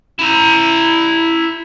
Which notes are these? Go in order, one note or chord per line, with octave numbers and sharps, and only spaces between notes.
E4 A#5